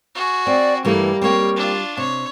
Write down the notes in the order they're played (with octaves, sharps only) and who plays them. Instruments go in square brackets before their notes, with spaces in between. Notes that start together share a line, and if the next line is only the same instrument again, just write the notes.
[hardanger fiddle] F#4 G#4
[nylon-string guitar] C4 [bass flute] D5
[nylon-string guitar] G2 E3 A3 [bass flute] G3 [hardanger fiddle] A#3
[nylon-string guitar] A#3 C4 [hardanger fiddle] C#5
[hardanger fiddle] D4 F4
[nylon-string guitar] C3 [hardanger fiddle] C#5